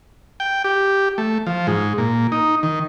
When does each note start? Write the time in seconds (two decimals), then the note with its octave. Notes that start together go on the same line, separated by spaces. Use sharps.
0.40 G5
0.64 G4
1.18 A3
1.47 F3
1.67 G#2
1.98 A#2
2.32 D#4
2.63 D#3